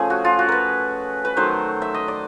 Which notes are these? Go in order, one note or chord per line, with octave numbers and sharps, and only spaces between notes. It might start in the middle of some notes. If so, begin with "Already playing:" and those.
Already playing: F3 A3 C#4 G#4
F#4
F4
F#4
A#4 B4
B4
D#3 F#3 A3 C5
E5
D#5
D5